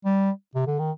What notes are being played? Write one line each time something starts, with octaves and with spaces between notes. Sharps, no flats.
G3
C3
D3
D#3